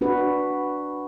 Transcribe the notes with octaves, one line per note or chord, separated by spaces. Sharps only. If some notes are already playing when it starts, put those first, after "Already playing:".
D4 F#4 B4